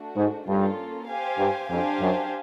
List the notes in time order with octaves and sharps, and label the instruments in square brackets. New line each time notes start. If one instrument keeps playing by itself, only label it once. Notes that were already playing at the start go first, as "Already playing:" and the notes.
Already playing: [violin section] A3 D4 F#4
[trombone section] G#2
[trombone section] G2 [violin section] A#3 C#4 F4 A4
[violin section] G4 C5 F5 G#5
[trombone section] G2
[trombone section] F2 [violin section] D4 G4 C5 F5 G#5
[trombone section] F#2